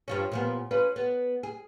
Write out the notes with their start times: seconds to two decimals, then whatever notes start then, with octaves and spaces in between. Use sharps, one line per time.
0.08 G2 F3 C#4
0.32 A#2 F3 B3
0.71 C#4 F4 B4
0.96 B3
1.43 G#4